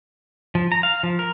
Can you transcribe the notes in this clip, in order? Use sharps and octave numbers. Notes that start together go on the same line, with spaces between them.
F3
A#5
F5
F3
A#4